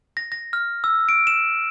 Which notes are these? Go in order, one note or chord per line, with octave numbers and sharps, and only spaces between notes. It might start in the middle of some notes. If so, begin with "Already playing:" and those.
A#6
A#6
F6
E6
D7
E7